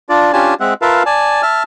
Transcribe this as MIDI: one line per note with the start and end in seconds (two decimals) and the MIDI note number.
0.09 0.33 62
0.09 0.33 65
0.09 0.33 74
0.33 0.54 61
0.33 0.54 62
0.33 0.54 65
0.33 0.54 67
0.33 0.54 80
0.33 0.54 81
0.60 0.74 56
0.60 0.74 60
0.60 0.74 76
0.60 0.74 78
0.82 1.03 65
0.82 1.03 70
0.82 1.03 71
0.82 1.03 76
0.82 1.03 77
0.82 1.03 81
1.06 1.42 74
1.06 1.42 80
1.06 1.42 81
1.43 1.63 76
1.43 1.63 81
1.43 1.63 89